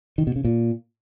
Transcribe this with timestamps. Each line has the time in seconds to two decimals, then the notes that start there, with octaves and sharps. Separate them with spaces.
0.18 D#3
0.27 B2
0.36 C#3
0.45 A#2